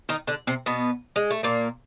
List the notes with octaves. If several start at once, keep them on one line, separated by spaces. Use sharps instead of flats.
D#3 D#4
D3 D4
C3 C4
B2 B3
G#3
A3
A#2 A#3